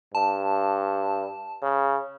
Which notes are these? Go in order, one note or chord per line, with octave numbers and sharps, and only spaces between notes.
G2 A5
C#3